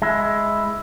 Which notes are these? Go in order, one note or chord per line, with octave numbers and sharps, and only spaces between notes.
G#3 E4